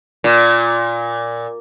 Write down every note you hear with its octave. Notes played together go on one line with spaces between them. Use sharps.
A#2